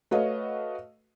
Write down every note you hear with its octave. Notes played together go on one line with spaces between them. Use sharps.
A3 F#4 B4 C#5 D#5 F5